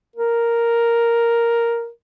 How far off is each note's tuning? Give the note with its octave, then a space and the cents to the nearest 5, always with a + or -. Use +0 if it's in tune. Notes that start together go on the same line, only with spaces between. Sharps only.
A#4 +0